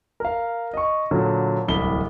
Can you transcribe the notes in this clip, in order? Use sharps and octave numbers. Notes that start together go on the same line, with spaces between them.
A#4 F5
D#5 C#6
A#2 D3 F#3
D1 C2 B5 G7